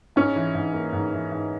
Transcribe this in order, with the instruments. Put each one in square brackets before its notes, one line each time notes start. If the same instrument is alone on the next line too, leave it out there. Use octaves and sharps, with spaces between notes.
[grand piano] G#2 [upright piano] C#4
[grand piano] E3
G#2
A#3
G#2
E3
G#2